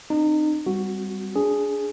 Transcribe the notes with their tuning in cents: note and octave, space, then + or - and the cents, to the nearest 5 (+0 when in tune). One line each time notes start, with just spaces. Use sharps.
C4 +10 D#4 -30
G3 +5 C4 -15 F#4 +0
D4 -25 G#4 +0